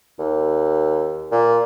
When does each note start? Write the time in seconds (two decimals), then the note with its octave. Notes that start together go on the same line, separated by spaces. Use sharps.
0.19 D#2
1.32 A#2